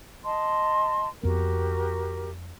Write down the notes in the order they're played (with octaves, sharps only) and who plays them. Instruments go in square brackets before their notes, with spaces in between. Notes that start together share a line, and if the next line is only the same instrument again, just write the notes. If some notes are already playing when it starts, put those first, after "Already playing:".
[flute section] D#5 A5 C6
[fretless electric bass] F2 B3 [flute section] F#4 G4 A#4